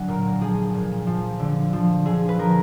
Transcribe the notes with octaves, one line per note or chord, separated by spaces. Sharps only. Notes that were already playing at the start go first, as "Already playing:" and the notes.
Already playing: D3 F#3 F#5 G#5
A#2 A#4
F3 G#4
A#2
F3
D3
F3
D3 G#4
B4
F3 A#4